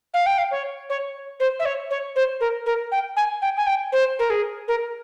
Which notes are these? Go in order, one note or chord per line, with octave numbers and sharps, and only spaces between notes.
F5
G5
F5
C#5
C#5
C5
E5
C#5
C#5
C5
A#4
A#4
G5
G#5
G5
G#5
G5
C5
A#4
G#4
A#4